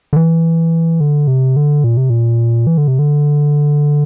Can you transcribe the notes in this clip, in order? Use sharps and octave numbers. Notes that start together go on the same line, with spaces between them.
D3
E3
D3
C3
D3
A#2
C3
A#2
E3
D3
C3
D3